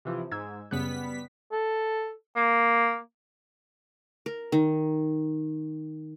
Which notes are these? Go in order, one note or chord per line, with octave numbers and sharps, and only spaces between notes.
C3 E3 F3
G#2 E6 G#6
F#2 C#3 G3 B3 F#6 B6
A4
A#3
A#4
D#3